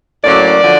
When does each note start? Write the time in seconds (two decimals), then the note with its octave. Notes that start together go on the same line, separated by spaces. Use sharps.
0.24 A2 F#3 A#3 C#4 D5
0.62 D3 F3